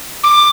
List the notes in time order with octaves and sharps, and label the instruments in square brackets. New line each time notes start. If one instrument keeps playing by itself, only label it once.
[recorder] D6